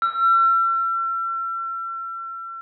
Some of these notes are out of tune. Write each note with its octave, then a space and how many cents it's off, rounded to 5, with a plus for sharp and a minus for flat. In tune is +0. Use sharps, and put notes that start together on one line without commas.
E6 +45